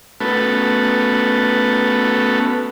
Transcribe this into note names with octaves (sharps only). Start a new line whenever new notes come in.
A3 B3 C#4 F#4 A4 B4